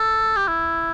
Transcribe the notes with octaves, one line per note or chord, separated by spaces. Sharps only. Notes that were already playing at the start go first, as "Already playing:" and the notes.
Already playing: A4
G4
E4